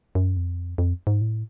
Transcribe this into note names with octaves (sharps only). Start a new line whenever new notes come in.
F#2
F2
F2
G#2
A2